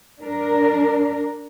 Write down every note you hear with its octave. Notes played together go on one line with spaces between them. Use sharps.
D4 A#4